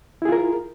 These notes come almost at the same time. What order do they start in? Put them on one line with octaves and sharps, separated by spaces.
E4 G#4 F4 A#4